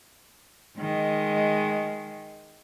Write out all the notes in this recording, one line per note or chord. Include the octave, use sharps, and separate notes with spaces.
D#3 G#3